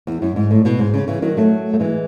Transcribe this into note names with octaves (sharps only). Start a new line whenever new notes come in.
E2
F#2
G#2
A2
B2
G#2
C#3
C#3 E3
D#3 F#3
F#3 A3
A3
E3 G#3